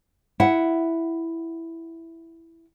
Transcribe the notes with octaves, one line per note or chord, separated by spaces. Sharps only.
E4 F#5